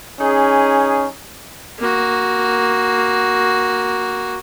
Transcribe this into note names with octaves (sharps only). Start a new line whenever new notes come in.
C#4 D#4 G#4
A#3 F#4